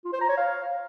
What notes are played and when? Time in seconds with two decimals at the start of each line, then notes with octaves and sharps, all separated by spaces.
0.05 F4
0.13 C5
0.21 A#5
0.29 C#5
0.37 F5